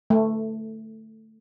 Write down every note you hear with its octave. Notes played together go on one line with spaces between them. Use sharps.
A3